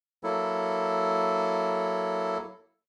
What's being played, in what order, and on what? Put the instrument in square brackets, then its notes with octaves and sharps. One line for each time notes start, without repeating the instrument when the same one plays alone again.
[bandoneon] F#3 A#3 E4 A4